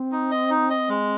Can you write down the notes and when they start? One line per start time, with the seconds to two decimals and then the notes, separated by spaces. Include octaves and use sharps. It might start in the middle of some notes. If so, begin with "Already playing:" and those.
Already playing: C4
0.12 D#4
0.31 D#5
0.50 D#4
0.70 D#5
0.89 G#3